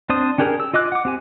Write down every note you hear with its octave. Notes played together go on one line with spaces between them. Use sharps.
C4 D4 C5 D#6
C#4 D4 G4 G#4 A#4
E6
F4 D#5 D6 F#6
F#5 D6
C4 G4 G#5